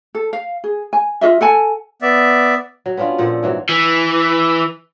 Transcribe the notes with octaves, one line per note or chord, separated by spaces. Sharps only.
A4
F5
G#4
G#5
F4 G#4 D#5 E5
A4 F#5 G#5 A5
B3 D5 E5
F#3
B3 C#4 D4 F4
A#2 F3 A4 F#5
G#2 E3 F#3
E3